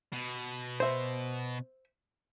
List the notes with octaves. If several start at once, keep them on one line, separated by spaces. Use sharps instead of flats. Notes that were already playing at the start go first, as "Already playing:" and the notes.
B2
C5 E5